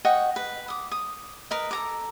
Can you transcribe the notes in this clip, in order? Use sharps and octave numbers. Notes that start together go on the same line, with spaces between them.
D#5 F#5 G5 C#6
B4
D6 D#6
D#6
A#4 B4 D#5
A4 A#5 D6